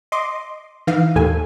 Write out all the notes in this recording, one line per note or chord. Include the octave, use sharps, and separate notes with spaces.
D#5 C6 D6
E3 D#4 F5
D#2 A2 A4 G#5